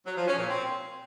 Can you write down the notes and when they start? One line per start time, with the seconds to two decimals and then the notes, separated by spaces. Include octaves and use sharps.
0.06 F#3
0.17 F3
0.28 C#4
0.38 A#2
0.49 C4